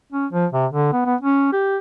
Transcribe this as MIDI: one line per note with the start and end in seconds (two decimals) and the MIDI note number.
0.13 0.26 61
0.33 0.46 53
0.53 0.66 48
0.73 0.91 50
0.93 1.01 59
1.06 1.15 59
1.21 1.49 61
1.53 1.78 67